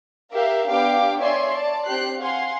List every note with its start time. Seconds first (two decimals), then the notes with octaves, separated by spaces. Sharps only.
0.32 G4 A#4 E5 F5
0.68 B3 D4 G4 F5 G5 D6
1.19 C#5 D5 E5 G#5 C6
1.54 D5 A5
1.85 C4 G4 F#6 C7
2.20 F5 F#5 G#5 C6